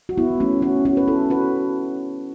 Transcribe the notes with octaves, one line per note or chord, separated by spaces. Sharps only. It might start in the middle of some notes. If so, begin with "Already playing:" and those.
F#4
B3 E4
A3 C#4
C#4 F#4
C#4 F#4
B4
E4 A4
F#4 B4